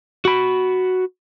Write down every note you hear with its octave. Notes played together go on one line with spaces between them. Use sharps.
F#4 B5